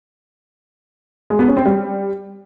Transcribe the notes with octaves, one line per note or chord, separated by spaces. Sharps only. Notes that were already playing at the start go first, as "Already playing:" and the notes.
G#3
B3
C#4
C4
G3